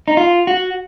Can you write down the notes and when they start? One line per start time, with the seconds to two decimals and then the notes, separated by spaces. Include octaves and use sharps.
0.08 D#4
0.17 F4
0.47 F#4